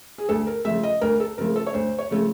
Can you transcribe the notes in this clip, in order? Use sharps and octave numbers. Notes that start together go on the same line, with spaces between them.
G#4
D2 A4
A#4
C#3 F3 A3 E5
D#5
D2 A#4
A4
C#3 F3 A3 A#4
A4
C#5
D2 C5
C#5
C#3 F3 A3